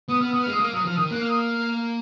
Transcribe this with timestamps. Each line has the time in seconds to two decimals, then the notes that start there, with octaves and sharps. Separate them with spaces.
0.08 B3 D#6
0.20 B3 F6
0.31 B3 D#6
0.42 F6
0.47 G#3
0.52 D#6
0.60 A#3 F6
0.73 F#3 D#6
0.85 F3 F6
0.96 D#3 D#6
1.11 A#3 F#6
1.20 F6
1.28 D#6
1.38 F6